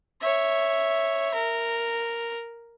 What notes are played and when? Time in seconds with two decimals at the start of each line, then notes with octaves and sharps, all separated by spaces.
0.21 C#5 E5
1.34 A#4